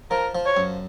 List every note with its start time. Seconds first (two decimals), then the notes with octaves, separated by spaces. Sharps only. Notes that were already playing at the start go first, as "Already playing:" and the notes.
0.11 F3 A#4
0.35 F3
0.46 C#5
0.57 F#2